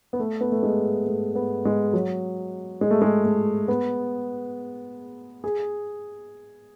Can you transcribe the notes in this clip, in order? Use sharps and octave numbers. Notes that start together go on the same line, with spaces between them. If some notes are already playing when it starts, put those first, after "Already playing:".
B3
A3
B3
A3
G#3
A3
B3
G#3
F#3
G#3
A3
G#3
A3
B3
G#4